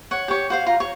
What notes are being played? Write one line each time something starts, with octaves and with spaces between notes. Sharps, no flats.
C#5 F#5
G4 C#5
F#4 C5 F5
F4 A#5
C#5